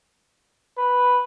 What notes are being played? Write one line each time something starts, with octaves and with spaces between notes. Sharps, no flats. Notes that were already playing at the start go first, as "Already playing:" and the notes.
B4